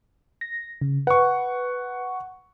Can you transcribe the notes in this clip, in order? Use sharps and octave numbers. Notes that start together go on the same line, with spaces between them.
A#6
C#3
B4 F#5 C#6